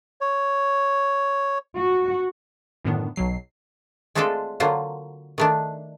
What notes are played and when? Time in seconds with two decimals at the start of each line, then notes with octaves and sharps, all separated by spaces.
0.21 C#5
1.78 F#4
2.84 F#2 A2 D3 D#3 B3 D4
3.16 B1 B2 F#3 C7
4.15 G#3 A3 C4 D4 F4 A4
4.60 D3 F#3 A#3 F4 C5
5.38 D#3 A3 D4